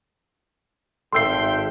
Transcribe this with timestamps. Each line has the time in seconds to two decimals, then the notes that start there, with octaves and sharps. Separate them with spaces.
1.13 G#1 A4 E5 F5 G5 C6 E6 C7